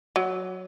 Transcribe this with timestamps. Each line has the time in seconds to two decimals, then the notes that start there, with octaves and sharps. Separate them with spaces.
0.16 F#3